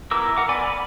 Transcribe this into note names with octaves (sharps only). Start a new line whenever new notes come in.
B3 E4 A#4 D6 E6
A#4 F#5 D6
B3 D5 G#5 B5 D6
B5